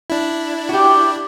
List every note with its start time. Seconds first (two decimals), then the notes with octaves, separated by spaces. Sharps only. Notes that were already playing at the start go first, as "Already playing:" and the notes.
0.10 D4 E4
0.69 F#4 G4